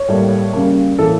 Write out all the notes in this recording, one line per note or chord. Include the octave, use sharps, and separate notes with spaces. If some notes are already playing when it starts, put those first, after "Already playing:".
Already playing: C#5
A2 G3 A#3
C#3 G3 A#3
A2 E3 A#3 A4